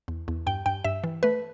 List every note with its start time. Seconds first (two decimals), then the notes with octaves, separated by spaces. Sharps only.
0.08 E2
0.28 E2
0.47 G2 G5
0.66 G2 G5
0.84 G2 E5
1.04 E3
1.23 A3 B4